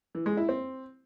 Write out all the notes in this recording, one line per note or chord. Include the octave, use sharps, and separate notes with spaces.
E3
G#3
E4
C4